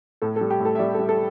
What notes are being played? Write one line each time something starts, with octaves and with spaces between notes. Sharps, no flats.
A2 A4
A4
G3
G4
A2
A4
E5
G3 D5
A4
G3
A4